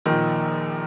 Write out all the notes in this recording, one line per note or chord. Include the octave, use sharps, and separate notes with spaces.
A#1 A#2 D#3 F3